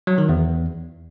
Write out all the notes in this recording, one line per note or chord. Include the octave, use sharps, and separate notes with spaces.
F#3
D#3
E2